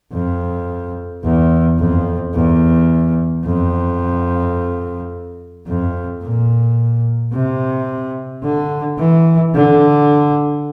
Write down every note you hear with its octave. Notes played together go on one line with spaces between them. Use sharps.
F2
E2
F2
E2
F2
F2
A#2
C3
D3
E3
D3